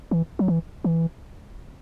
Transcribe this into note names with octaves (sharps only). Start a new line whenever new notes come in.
E3
F#3
E3
E3